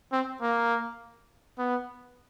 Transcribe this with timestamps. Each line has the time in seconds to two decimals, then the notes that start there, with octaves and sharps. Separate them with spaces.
0.12 C4
0.42 A#3
1.58 B3